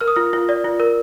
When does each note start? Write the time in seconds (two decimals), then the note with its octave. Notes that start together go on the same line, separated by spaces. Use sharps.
0.01 A#4 F6
0.07 D#6
0.16 F4 F6
0.33 F4
0.49 D5
0.64 F4
0.80 A#4